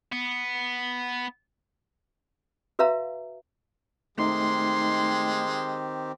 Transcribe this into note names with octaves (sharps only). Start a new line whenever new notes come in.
B3
F#4 B4 E5 F5 A#5
D#3 G#3 A3 C4 D#4 G4 C6